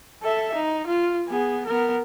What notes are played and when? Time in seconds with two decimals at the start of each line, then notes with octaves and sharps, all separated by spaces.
0.22 A4 E5
0.55 D#4
0.86 F4
1.28 B3 G#4
1.65 B3 A#4